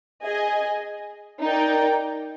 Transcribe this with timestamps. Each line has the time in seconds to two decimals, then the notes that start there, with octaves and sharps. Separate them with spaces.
0.25 G#4 D#5 G#5
1.42 D#4 A#4 D5 G5